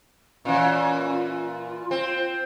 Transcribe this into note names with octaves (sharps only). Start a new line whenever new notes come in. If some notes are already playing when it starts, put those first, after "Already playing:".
A#2 E3 C#4
F4
C4